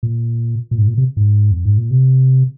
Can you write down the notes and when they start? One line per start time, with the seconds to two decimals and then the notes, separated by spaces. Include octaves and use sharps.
0.03 A#2
0.71 A#2
0.78 G#2
0.87 A#2
0.98 C3
1.17 G#2
1.51 F2
1.65 G#2
1.78 A#2
1.91 C3